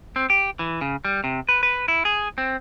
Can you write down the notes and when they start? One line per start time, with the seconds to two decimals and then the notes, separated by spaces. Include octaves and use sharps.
0.16 C4
0.30 G4
0.59 E3
0.81 C#3
1.05 G3
1.24 C3
1.49 B4
1.63 B4
1.88 E4
2.05 G#4
2.38 C4